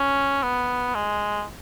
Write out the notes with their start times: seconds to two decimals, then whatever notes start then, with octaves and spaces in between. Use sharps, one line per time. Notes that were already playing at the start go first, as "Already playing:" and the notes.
Already playing: C#4
0.43 B3
0.95 G#3